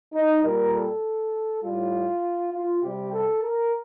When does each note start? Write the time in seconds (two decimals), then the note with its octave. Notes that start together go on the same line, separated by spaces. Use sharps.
0.14 D#4
0.44 A#2 G3 A#4
0.73 A4
1.63 A2 G3 F4
2.53 F4
2.82 C3 G3 G4
3.12 A4
3.42 A#4